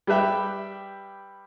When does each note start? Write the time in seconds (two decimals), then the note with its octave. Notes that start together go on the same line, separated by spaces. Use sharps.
0.07 G3 G4 B4 E5 G5